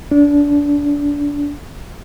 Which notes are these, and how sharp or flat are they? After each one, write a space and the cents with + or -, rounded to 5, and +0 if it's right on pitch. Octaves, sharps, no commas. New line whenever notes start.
D4 -25